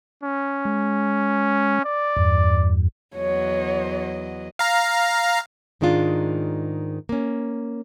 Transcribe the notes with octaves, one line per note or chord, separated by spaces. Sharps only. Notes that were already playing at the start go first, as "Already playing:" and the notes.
C#4
G#3
D5
E2 G2
E2 F#3 C#5 D#5
F5 A#5
G#2 D#3 G#3 D4 F4
A#3 C#4